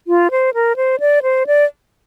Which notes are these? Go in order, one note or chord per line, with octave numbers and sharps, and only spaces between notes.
F4
C5
A#4
C5
D5
C5
D5